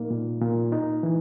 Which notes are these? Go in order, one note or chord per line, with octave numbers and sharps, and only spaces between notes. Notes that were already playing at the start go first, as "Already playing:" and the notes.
Already playing: A#2 A#3 D#4
A#2
A#2
D#4
E3